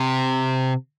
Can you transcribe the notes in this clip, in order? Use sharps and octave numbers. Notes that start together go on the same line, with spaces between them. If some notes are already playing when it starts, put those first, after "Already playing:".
Already playing: C3